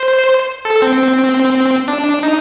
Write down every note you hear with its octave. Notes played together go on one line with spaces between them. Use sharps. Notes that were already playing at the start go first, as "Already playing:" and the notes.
Already playing: C5
A4
C4
D4
D#4